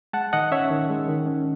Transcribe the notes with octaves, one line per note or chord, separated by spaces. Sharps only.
G#3 F#5 A5
D#3 D#5 F#5
C#4 C#5 E5
D#3
G#3
D#3
C#4